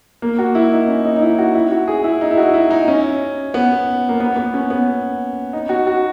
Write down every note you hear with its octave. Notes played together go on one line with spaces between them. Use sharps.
A#3
F#4
E4
D#4
C#4
D#4
D#4
E4
F#4
E4
F#4
G#4
E4
D#4
E4
F#4
E4
D#4
C#4
B3
A#3
B3
B3
C#4
B3
D#4
F#4
F#4